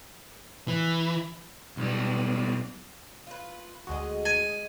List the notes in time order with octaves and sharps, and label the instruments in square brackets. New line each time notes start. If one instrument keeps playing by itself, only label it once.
[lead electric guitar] E3
[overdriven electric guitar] B1 G3
[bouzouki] F4 B4
[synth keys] D2 F#4 [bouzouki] G#3 G#4 D#5
[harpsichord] G#5